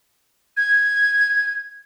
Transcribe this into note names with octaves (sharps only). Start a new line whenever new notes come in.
G#6